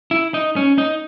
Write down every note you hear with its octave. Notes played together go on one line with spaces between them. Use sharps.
E4
D#4
C#4
D#4